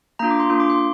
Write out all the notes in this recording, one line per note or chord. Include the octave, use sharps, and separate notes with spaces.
A#3 D4 F4 A#5
D6
C6
A#3 D4 F4 C6
D6
C6